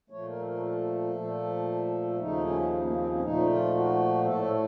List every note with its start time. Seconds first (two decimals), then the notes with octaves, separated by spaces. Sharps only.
0.10 A#2 F3 A3 C#5
0.28 A#4
0.41 A4
0.46 A#4
0.62 A4
1.14 A#2 F3 A3
2.19 D#2 C#3 F3 A3 D#4
2.44 C#4
2.61 A3
2.71 A#3
2.83 A#3
2.96 C4
3.09 C#4
3.22 A#2 F3 A3 D#4
3.49 F4
3.74 F#4
4.26 A2 A3 A4